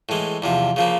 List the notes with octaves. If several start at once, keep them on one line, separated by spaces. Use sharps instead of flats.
A2 E3 G#3
E2 C3 F3
C#3 F3 A#3